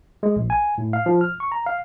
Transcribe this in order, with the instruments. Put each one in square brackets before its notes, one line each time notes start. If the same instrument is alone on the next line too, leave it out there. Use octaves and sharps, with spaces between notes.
[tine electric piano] G#3
A#1
G#5
A2
F5
F3
F6
C#6
A#5
F5